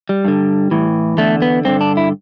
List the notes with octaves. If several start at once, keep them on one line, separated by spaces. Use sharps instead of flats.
G3
G2 D3
A2 E3
E2 D3 A3
B3
G2 D3 C4
D4
E4